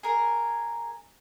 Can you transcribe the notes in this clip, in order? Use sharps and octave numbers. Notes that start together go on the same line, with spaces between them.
G#4 A#4